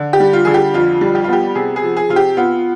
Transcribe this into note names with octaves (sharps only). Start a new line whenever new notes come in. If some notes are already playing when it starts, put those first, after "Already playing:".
Already playing: D3
G4
G3
F4
D3 G#4
G4
F2 F4
G3
G4
F4
B3 G4
C3 G#4
G#4
F3
G#4
C3 F4
G4
B3 F4